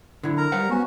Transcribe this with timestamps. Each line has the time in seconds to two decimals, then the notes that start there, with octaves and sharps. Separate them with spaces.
0.24 D3 E4
0.38 A#4 A#5
0.52 G3 C5 F5 F#5
0.70 B3 C#4 F#4